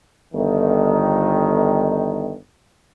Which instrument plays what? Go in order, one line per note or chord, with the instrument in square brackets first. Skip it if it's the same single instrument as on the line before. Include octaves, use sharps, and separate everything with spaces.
[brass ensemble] G1 D#3